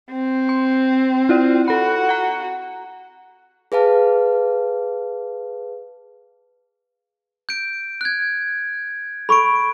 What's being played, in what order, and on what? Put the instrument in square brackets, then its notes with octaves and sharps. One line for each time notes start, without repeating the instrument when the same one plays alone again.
[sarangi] C4
[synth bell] C6
E4 F4 D5
[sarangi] F#4 [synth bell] A4 B5
[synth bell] F#5 A#5
[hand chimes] G#4 B4 F5 A5
[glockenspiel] G6 D7
F#6 G#6
[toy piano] A4 C#6 [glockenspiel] B5 D7